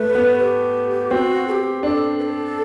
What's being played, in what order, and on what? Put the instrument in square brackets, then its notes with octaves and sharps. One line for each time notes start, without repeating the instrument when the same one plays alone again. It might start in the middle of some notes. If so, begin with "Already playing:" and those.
Already playing: [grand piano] A3 [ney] B4
[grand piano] B3
[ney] G4
[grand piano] C4 [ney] F#4
[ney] A4
G4
[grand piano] D4 [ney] A4
[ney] B4
A4